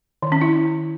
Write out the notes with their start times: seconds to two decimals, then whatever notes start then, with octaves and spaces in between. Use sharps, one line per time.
0.22 D#3
0.32 C#4
0.41 E4